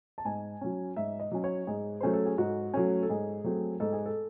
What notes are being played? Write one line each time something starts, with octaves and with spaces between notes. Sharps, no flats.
A5
G#2 G#5
F#3 C#4
G#2 E5
D#5
F#3 C#4
C#5
G#2 G#4
F#3 A3 C#4 C5
A4
G#4
G#2 F#4
F#3 A3 C#4
A4
G#2 G#4
F#3 A3 C4
G#2 A4
G#4
A4